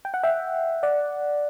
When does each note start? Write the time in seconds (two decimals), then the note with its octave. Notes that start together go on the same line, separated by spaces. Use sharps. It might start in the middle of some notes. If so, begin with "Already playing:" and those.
0.05 G5
0.14 F#5
0.23 E5 G5
0.83 D5 F#5